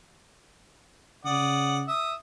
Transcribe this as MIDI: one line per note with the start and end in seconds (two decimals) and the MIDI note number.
1.25 1.89 49
1.25 1.81 74
1.25 1.81 78
1.25 1.81 87
1.87 2.14 76
1.87 2.14 87